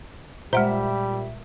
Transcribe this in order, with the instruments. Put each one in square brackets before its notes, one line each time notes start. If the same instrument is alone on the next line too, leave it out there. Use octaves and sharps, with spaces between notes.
[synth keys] A#2 E5 [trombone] G3 [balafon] G#3 F#5 A#5 [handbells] C5